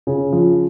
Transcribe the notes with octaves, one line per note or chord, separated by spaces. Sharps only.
C#3
F3